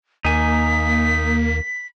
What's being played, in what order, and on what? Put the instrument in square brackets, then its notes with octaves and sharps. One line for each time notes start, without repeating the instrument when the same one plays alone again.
[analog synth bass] D#2 [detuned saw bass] A#3 [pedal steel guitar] D#4 G#5 [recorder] B6